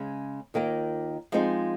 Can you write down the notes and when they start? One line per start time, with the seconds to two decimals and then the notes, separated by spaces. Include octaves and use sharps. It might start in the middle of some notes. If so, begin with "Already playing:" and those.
Already playing: C#3 G#3 C#4
0.54 D#2 D#3 A#3 F4 A#4
1.32 F3 G#3 C4 D#4 G#4